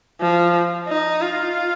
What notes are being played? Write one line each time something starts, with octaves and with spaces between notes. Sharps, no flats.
F3
D#4
F4